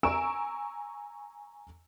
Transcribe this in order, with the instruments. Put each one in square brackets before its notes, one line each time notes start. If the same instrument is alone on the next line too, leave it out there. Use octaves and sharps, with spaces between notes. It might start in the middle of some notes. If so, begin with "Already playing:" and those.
[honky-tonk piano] G#5 A#5 C#6 E6 D7 E7